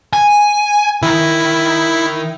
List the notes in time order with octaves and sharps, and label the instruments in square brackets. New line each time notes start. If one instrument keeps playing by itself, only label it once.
[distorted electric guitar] G#5
[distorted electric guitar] D#3 [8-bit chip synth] E4